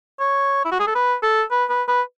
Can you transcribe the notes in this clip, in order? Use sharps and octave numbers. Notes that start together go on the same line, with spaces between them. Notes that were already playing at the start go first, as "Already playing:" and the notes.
C#5
E4
F#4
G#4
A4
B4
A4
B4
B4
B4